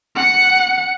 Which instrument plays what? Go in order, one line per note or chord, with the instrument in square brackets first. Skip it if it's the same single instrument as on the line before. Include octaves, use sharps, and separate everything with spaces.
[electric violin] F#5 C#7